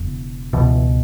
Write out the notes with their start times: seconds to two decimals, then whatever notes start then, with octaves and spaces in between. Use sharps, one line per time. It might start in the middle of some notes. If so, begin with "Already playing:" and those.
Already playing: E1 E2 C#3
0.53 C#2 B2 E3